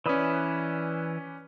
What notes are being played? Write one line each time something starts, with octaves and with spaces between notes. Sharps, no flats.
E3 C#4 B4 D5 B5 D#6